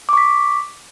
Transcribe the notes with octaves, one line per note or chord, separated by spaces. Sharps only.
C#6 D6 B6